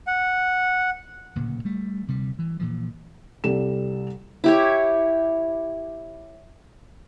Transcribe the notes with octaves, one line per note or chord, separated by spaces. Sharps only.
F#5
D1 A#2 C#3
G3 A3
D2 C3 G3
E3
A#2 E3 F3
C2 G3 A4 E7
E4 G4 C#5